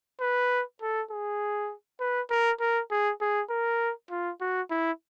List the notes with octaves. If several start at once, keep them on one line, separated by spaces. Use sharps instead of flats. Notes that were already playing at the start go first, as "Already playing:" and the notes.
B4
A4
G#4
B4
A#4
A#4
G#4
G#4
A#4
F4
F#4
E4